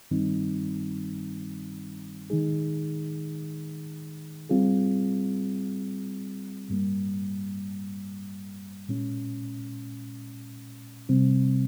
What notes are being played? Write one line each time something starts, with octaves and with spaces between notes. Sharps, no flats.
G2 D#3 G3 C4 D#4
D#3 G#3 D#4 G#4
G3 C4 F4 G#4
G2 G3 A#3
A#2 G#3 C#4
C3 G3 C4